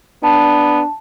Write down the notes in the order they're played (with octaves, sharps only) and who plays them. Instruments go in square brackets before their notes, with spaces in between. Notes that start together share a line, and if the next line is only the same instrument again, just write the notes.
[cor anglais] B3 [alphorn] D4 [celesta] A5